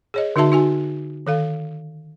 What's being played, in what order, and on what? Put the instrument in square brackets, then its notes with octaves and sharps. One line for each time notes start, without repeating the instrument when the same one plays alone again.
[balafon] G#4 C#5 D#5
D3 D#4 F#4 E5 A5
D#4 F#4 G#5
D#3 A4 F5